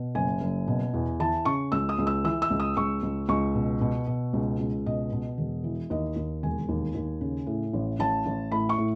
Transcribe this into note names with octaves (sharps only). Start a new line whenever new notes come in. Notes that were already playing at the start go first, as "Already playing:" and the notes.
Already playing: B2
F#1 G#5
F#1
B2
E2
E3 A5
C#3 C#6
C#2 E6
D#6
C#2
E6
E3 E6
E6
C#2
D#6
C#2 C#6
C#2
C#2 C#6
B2
B2
B2
C#2
C#2
B2 D#5
B2
E1
E3
D#2 D#5
D#2
E1 G#5
D#2
D#2
C#3
A2
A1
A1 A5
A1
A2 B5
C#6
A2